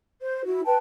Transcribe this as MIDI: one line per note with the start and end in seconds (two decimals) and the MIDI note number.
0.21 0.45 72
0.46 0.62 64
0.46 0.62 66
0.65 0.77 71
0.65 0.77 79
0.65 0.77 81